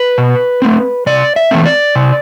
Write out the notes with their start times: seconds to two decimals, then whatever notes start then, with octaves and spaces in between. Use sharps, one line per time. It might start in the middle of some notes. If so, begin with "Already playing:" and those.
Already playing: B4
0.18 B2
0.62 A3 C4
1.06 C3 D5
1.36 E5
1.51 E3 A3 C4
1.66 D5
1.95 C3